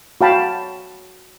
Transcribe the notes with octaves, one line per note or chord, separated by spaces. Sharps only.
F#4 C#5 F5 G5 A5 B5